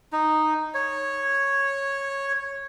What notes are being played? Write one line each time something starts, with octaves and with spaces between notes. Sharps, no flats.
D#4
C#5